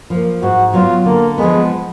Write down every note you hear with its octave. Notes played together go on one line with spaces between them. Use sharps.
F3 A#3
G#2 F#4
F#3 B3 F4
D3 A#3
F3 G#3 B3